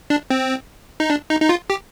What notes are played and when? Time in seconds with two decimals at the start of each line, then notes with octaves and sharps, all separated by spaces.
0.10 D4
0.30 C4
1.00 D#4
1.10 D4
1.30 D#4
1.41 D#4
1.49 F4
1.70 G4